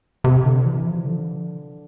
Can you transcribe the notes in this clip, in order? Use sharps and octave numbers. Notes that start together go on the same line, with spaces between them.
C3
D3
E3
F3
D3